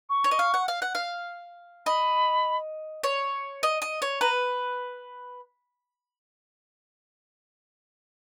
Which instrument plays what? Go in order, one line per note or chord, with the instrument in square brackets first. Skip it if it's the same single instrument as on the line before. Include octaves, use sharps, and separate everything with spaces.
[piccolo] C#6
[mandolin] C#5
D#5
F5
F#5
F5
F#5
F5
[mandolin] D#5 [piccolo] B5
[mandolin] C#5
D#5
D#5
C#5
[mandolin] B4 [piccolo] A#5